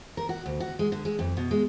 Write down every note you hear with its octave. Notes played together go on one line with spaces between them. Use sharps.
A#4
F#4
D2
F#4
G#3
D3
G#3
F2
B2
G#3